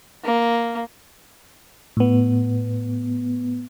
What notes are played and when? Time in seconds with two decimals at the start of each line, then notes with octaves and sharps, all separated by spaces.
0.24 A#3
1.97 A2 B3